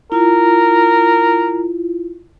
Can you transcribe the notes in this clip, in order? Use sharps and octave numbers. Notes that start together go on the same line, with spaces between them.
E4 F4 A#4